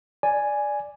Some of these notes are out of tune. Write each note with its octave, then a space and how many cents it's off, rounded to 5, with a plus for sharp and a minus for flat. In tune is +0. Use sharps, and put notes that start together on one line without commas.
D5 +0 G#5 +0